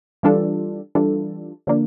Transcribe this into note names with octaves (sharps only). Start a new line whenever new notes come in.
E3 G3 D4 F4 A4
E3 G3 D4 F4 A4
D3 F3 A#3 D4